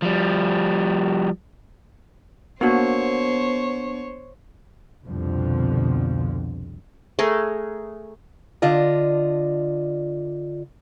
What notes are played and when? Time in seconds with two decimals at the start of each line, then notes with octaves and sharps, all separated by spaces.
0.02 F3 G3
2.61 A#3 B3 D4 F#4 C5 C#5
5.06 C2 F2 B2 D3 F3
7.19 A3 G#4 A#4
8.62 D3 D4 F4 D#5